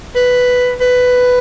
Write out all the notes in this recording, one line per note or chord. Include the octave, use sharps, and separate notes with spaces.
B4
B4